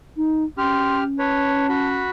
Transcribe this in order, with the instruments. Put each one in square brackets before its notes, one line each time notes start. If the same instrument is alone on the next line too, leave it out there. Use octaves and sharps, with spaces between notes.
[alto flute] D#4
[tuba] C#4 [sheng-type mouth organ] G4 F6 [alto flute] C6
[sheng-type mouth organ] B4 C#5 [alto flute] A5
[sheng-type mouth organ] F#4 B5